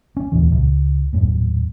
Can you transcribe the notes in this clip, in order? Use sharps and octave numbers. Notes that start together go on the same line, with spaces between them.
C#4
D#2 A#2 E3
C#2
D#1 F#2 A2